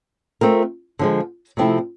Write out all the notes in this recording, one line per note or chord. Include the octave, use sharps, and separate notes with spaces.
A3 C4 F4 A#4
D3 F3 G#3
C3 F3 A3 C4 E4